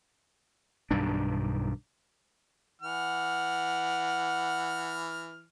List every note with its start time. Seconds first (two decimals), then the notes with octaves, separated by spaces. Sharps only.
0.91 B1 G2 D#3 D4
2.82 E3 F#5 F6